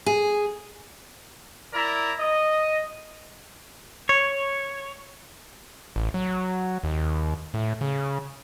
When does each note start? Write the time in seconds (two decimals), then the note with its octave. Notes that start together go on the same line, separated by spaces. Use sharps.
0.06 G#4
1.73 E4 A#4 D5 A#5
2.19 D#5
4.09 C#5
5.96 A1
6.14 F#3
6.84 D#2
7.54 A2
7.81 C#3